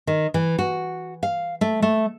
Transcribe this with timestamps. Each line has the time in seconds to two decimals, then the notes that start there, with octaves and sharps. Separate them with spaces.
0.07 D#3
0.34 E3
0.58 F#4
1.23 F5
1.61 A3
1.82 A3